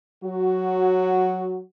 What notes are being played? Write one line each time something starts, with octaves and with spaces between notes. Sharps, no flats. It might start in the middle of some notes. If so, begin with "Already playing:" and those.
F#3 F#4